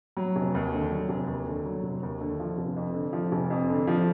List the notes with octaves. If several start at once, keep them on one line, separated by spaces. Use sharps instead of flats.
F#3
F1
D#2
D3
F#3
F1
D#2
D3
F#3
F1
D#2
D3
F3
F1
F2
D3
F3
F1
F2
D3
F3